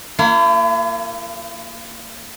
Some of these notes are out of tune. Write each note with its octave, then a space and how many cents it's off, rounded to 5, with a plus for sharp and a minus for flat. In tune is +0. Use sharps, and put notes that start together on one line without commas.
A#3 -25 E4 +40